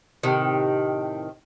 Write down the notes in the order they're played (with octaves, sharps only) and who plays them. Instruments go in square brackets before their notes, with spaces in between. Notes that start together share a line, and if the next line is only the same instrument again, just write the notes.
[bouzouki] A2 C3 D#3